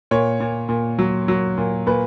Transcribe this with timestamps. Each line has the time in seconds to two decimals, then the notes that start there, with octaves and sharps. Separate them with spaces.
0.11 A#2 C#5
0.40 A#2
0.69 A#2
0.99 F#3
1.28 F#3
1.58 A#2
1.87 A#2 B4